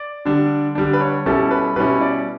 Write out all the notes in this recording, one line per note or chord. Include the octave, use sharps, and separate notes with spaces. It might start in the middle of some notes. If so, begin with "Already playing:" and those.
Already playing: D5
D3 G3 D4
D3 G3 D4
B4
C#5
B2 G3 C#4 E4 A4
B4
B2 G3 C#4 E4 B4
D5